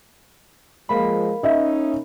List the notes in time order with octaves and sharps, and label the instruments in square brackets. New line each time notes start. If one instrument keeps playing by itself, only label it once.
[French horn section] F3 G#3 [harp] A#3 B5
[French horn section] C#4 D#4 [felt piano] D#5 E5